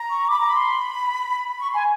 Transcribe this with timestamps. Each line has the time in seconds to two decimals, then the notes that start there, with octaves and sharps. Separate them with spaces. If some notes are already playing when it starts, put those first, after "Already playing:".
Already playing: A#5
0.09 C#6
0.28 B5 D6
0.39 A#5
0.48 B5
0.55 C6
1.59 C#6
1.70 G#5 C6